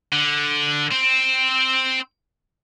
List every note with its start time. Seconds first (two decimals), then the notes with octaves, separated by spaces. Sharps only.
0.13 D3
0.92 C4